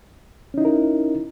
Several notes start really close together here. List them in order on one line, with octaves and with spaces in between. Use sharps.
C#4 D#4 E4 A#4